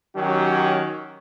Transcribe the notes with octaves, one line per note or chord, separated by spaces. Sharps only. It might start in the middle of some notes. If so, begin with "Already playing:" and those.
D#3 F#3 C#4 G4